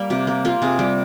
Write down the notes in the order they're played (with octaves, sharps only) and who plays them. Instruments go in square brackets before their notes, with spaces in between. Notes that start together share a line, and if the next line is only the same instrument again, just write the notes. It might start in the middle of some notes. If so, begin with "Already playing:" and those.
Already playing: [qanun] G3 A#3
C3 G4
A#3
A#3 F4
C3 G#4
G3 G4